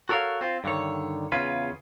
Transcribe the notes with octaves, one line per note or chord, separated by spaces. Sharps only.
F#4 A4 A#4 C#5 F5
C4 F4
G2 D3 D#3 C#5
E2 C#3 C#4 F4 B4